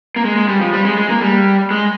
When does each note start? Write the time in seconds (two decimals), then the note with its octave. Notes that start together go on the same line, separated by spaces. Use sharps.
0.16 A#3
0.25 G#3
0.36 G#3
0.48 G3
0.61 F3
0.73 G3
0.85 G#3
0.97 G#3
1.10 A#3
1.22 G3
1.71 G#3